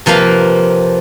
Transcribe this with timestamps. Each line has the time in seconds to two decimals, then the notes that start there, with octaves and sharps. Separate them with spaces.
0.06 C3 F3 A#3 B4 F5